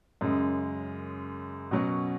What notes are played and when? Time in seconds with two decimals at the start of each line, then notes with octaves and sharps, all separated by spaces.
0.21 F#2 C#3 G#3
1.71 B2 F#3 C#4